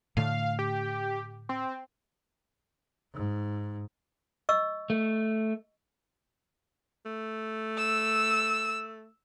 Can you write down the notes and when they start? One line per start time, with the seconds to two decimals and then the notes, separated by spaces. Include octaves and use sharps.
0.17 A2 D3 A3 F5
0.59 G4
1.49 C4
3.14 G#2
4.49 D#5 C#6 E6
4.90 A3
7.06 A3
7.77 E6